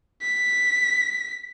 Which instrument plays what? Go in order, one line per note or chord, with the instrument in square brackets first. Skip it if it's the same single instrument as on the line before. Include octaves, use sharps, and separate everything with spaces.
[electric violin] B6